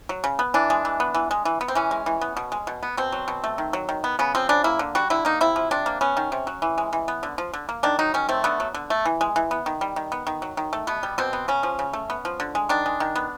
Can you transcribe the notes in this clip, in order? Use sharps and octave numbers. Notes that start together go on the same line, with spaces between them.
F#3
C#3
B3
E3 D4
G#3
E3
B3
E3
G#3
E3
B3
C4
E3 C#4
G#3
E3
B3
B2
G#3
B2
B3
B2 C4
F#3
B2
A3
D#3
F#3
D#3
B3
C#3 B3
F3 C4
C#3 D4
A#3 E4
D3
G3 F#4
D3 E4
A#3 D#4
C3 E4
F3
C3 D4
A#3
B3 C#4
D#3
C3
F#3
E3
G#3
E3
B3
D3
F3
D3
A#3
D#3 D4
F#3 D#4
D#3 C#4
A3 C4
D3 B3
F#3
D3
A3
E3
G#3
E3
B3
D#3
G3
D#3
B3
D#3
F#3
D#3
A3
B2 B3
G3
B2 C4
B3
C#3 C#4
F3
C#3
A3
B3
F3
D3
G#3
D#3 D4
G#3
D#3
B3